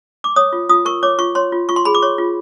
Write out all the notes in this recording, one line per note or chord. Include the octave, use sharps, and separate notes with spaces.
D6
C#5 D#6
F4
F4 D#6
A#4 C#6
C#5 D6
F4 C#6
C#5 C6
F4
F4 C#6
C6
G#4 B5
D6
C#5 C#6
F4